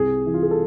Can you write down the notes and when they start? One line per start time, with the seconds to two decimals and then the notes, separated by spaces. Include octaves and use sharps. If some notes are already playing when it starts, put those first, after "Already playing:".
Already playing: C2 G#4
0.26 E3
0.34 F4
0.42 G#4
0.51 A4